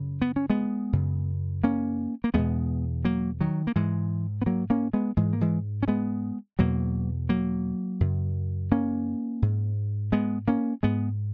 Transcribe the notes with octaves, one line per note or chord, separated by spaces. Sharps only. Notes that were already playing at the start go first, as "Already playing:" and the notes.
Already playing: F#2 C#3
B3
C#4
G#3 B3
F#2 C#3
A#3 C#4
A#3
E2 B2 G#3 B3
F#3 A#3
D#3 F#3
A#3
G#2 E3 G#3
B3
F#3 A#3
A#3 C#4
G#3 B3
G#2 E3 G#3
A#3
E3 G#3
C#4
G#3 B3
E2 B2 F#3 A#3
F#3 A#3
F#2 C#3
A#3 C#4
G#2
G#3 B3
A#3 C#4
G#2 G#3 B3